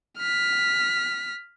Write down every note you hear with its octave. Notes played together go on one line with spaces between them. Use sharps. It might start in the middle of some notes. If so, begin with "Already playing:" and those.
F6 B6